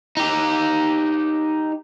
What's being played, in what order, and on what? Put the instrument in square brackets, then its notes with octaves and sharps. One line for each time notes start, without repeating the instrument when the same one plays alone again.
[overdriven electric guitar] D#4 G4